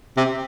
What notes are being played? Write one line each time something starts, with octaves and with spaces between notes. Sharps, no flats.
C3